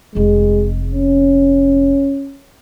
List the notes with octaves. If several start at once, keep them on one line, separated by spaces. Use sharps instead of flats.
F1 C3 G#3
C#4